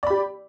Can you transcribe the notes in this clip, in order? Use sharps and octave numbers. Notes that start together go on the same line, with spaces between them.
G4 D5 B5